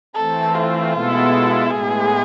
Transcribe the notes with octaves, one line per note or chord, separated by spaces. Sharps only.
E3 A3 C4 A4
F4
B2 G#3 B3 E4 A4
A2 G#3 B3 G#4